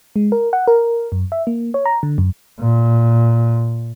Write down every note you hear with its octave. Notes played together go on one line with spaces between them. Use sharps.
G#3
A#4
F#5
A#4
F#2
E5
A#3
C#5
A#5
D3
F#2
A#2